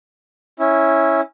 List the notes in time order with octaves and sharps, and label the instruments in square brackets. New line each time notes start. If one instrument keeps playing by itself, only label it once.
[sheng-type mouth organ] C#4 E4